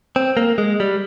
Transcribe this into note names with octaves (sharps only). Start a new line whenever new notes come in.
C4
A#3
G#3
G3